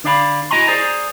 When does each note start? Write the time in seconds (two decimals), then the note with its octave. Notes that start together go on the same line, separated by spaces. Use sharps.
0.04 D3 D4 D5 F5 G5 B5
0.51 E4 F#4 D#5 G#5 A#5 C6
0.67 G#4 C5 D5 G#5 A#5